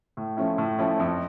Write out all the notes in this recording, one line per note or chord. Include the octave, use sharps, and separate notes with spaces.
A2
F3 A3 C#4 E4
A2
F3 A3 C#4 E4
F2